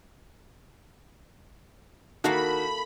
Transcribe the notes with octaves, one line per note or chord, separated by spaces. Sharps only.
D#3 A#3 E4 F#4 A4 B5